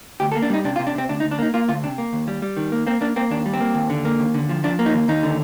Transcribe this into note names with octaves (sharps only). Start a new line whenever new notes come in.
D2 G4
A4
A#3
D4
G3 D#4
C3 D4
F4
C3
D4
C3 C4
D2 D4
D#4
D2
D4
A#3 D#4
A#3 F4
D2 F4
C3 D4
A#3
D#2
G3
G3
D#3
A#3
A#3 C4
A#3 D4
A#3 C4
D#2 D4
G3
C4
A#3
D#2
D3
A#3
D#2
D3
F3
F3 D4
A#3
D#4
D#2
D#2 D#4
D3